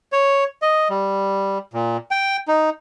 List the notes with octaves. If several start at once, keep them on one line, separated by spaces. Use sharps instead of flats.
C#5
D#5
G3
A#2
G5
D#4